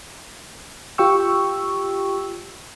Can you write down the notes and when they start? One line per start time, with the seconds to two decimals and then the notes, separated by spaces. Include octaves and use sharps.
0.98 F4 G4 G5 C#6 E6